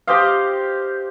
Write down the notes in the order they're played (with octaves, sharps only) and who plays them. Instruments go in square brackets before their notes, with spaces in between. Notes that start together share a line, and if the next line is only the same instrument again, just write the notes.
[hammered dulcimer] G4 C5 D#5 F5